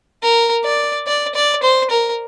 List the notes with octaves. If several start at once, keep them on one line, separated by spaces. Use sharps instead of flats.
A#4
D5
D5
D5
C5
A#4